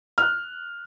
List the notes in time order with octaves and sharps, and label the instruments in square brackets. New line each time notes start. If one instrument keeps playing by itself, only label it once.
[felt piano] F6 F#6